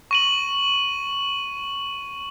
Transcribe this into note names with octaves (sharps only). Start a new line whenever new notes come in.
C#6 D#7 F#7